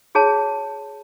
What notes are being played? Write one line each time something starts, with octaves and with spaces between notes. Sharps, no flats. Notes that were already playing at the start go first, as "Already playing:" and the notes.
F#4 G#4 C#5 A5